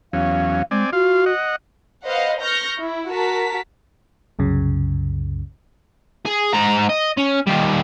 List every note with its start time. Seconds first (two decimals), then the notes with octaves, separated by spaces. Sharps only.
0.13 E2 F#3 C#4 F5
0.71 G#3 C4 D5 G#5
0.93 F4 F#4 F5
1.26 D#5 F#5
2.06 B4 C5 D#5 F5 F#5
2.42 C#6 F6 G6 A#6
2.79 E4
3.10 F#4 A#4 A5 B6
4.39 C2 F#2 C#3
6.25 G#4
6.53 G#2 A#5
6.89 D#5
7.17 C#4
7.47 D#3 G3